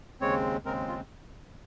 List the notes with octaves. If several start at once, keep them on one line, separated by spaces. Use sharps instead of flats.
D#2 C#3 G#3 C4 C#5
D#2 C#3 G#3 C4 A#4
F4